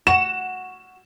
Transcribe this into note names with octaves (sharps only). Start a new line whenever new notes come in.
F#4 E7